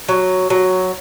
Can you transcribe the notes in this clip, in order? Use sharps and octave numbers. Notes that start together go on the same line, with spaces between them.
F#3
F#3